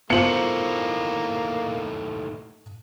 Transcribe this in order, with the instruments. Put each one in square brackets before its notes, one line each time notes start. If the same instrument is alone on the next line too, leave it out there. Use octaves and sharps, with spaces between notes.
[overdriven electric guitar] D#2 A2 [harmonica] A#3 [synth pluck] B3 F4 C5 [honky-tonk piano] C#7 F#7